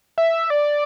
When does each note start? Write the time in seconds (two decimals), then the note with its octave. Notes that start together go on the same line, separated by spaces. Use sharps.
0.18 E5
0.50 D5